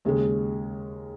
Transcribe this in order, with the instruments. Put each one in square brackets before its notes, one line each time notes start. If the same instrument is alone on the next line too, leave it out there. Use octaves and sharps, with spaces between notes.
[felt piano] D#2 C#3 G#3